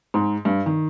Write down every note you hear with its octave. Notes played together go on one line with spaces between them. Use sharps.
G#2
G2
D#3